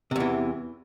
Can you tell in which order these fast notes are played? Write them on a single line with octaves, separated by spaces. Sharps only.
C3 E2 E3